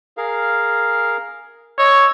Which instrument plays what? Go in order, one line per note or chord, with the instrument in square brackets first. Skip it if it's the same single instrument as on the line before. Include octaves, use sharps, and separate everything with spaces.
[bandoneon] G#4 A#4 F5
[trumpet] C#5 [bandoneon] D#5 E6